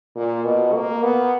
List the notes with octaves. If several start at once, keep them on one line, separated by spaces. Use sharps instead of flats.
A#2
B2
A#3
B3